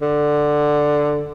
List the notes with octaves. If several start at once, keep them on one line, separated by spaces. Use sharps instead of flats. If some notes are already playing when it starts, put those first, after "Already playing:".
D3